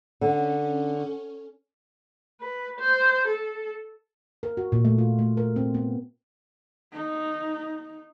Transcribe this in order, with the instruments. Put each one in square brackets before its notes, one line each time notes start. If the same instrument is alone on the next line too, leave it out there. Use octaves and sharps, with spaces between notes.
[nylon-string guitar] D3 [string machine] C#4
[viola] B4
C5
A4
[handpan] A#4
F#4
A#2
A3
F4
A3
A#4
C4
B3
[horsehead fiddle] D#4